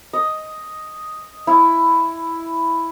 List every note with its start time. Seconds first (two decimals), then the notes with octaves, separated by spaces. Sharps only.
0.13 D#5
1.47 E4